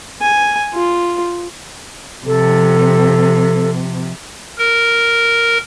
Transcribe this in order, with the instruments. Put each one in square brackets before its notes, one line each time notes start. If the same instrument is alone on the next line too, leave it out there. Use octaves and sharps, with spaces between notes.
[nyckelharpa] G#5
F4
[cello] C3 F3 [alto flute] A4
[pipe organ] A#4